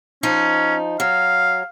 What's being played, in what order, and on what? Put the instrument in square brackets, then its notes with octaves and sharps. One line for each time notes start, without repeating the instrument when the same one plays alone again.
[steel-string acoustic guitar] F3 D#4 [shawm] C#4
[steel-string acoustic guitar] F#3 [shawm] F5